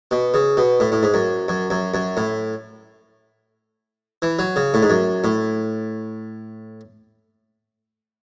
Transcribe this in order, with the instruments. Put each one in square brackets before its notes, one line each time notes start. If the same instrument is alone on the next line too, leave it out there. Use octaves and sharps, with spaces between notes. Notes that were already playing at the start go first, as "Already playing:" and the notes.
[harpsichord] B2
C#3
B2
A2
A2
G#2
F#2
F#2
F#2
F#2
A2
E3
F#3
C#3
A2
G#2
F#2
A2